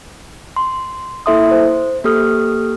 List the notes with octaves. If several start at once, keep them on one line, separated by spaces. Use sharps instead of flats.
C6
A#3 E4 A4 E5 C6 D#6
C5
A#3 G4 A4 D#6 F6